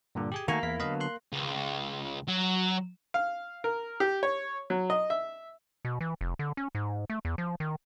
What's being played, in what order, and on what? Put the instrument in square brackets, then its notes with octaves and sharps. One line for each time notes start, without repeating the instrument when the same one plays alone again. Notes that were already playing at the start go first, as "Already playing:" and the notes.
[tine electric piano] G2 A#2 D3
G4 G#4 G#5
[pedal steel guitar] D#3 A3 [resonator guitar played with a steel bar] A#3 [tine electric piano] F#4 G#5 C#6
[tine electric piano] E2 F5 B6 [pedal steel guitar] E4
[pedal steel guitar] D3 F#3 B3 [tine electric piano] D#5 F5 B5
[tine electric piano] C6 F#6
[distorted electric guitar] C#2
F#3
[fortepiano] F5
A#4
G4
C#5
F#3
D#5
E5
[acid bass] B2
E3
F1
D3
C#4
G#2
A3
E2
F3
D#3